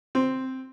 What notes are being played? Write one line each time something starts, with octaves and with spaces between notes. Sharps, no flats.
C4